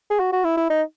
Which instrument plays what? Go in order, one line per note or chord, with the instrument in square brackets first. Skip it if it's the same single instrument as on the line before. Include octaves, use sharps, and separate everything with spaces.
[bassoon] G#4
F#4
F#4
E4
E4
D#4